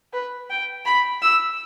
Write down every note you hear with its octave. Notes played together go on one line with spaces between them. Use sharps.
B4
G5
B5
E6